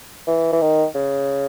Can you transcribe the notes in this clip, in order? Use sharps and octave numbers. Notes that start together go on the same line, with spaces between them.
E3
E3
D#3
C#3